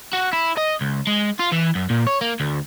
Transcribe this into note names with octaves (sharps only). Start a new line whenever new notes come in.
F#4
E4
D#5
C#2
G#3
F4
E3
F#2
A#2
C#5
A#3
D2